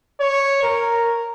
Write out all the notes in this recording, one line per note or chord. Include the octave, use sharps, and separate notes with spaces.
C#5
A#4